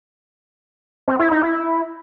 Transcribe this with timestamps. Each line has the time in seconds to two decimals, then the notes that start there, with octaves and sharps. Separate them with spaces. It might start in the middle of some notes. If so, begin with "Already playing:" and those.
1.08 C4
1.19 E4
1.31 D#4
1.43 E4